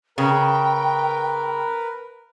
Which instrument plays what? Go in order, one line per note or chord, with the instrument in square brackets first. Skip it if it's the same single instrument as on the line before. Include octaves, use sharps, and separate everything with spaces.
[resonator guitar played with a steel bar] C#3 [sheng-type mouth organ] A#4 B4 [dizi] G5